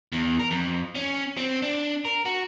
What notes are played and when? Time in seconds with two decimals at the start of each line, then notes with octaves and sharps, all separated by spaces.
0.12 E2
0.39 A#4
0.51 F2
0.95 C#4
1.37 C4
1.62 D4
2.05 A#4
2.25 F#4